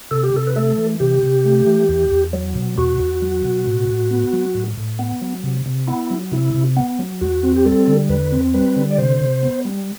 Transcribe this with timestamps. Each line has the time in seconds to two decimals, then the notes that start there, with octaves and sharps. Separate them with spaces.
0.11 C3 A4
0.23 G4
0.34 C3 A4
0.47 B4
0.56 A3 A4
0.78 E3
1.00 C3 G4
1.23 C3
1.45 A3
1.66 E3
1.89 E2
2.12 E2
2.33 F#3
2.55 B2
2.78 E2 F#4
3.00 E2
3.22 F#3
3.44 B2
3.66 A2
3.89 A2
4.11 B3
4.33 F#3
4.55 A2
4.77 A2
4.99 B3
5.21 F#3
5.44 C3
5.66 C3
5.87 B3 E4
6.10 F#3
6.32 C3 E4
6.54 C3
6.77 B3
6.99 F#3
7.21 E2 F#4
7.43 C4
7.56 G4
7.65 G3 A4
7.88 D3
8.09 E2 B4
8.32 C4
8.54 G3 B4
8.76 D3
8.91 D5
8.98 C3 C5
9.20 C3
9.43 B3
9.65 G3